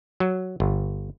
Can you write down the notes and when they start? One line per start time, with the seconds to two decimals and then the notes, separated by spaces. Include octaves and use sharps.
0.20 F#3
0.60 G1